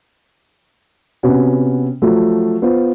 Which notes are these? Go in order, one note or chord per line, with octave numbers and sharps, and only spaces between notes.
C3 B3 C#4 F#4
F3 F#3 A3
B3 F4 C5